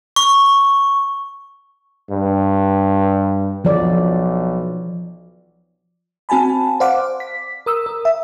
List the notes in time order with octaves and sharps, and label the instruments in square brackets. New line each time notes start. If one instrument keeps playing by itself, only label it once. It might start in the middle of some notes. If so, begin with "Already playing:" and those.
[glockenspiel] C#6
[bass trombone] G2
[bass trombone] B1 [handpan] F3 D5
[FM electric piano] C4 F#4 G#5 A5 B5
C5 D5 F5 F#5 D6
B6
A#4 D#6 E6
A#4
E5